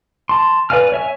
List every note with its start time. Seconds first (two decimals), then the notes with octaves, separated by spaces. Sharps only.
0.29 A5 C6
0.70 B4 D5 F5 G#5 F6
0.92 C#5 E5 G#5